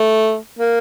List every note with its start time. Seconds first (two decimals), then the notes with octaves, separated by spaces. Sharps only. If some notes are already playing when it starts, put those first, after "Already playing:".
Already playing: A3
0.59 A#3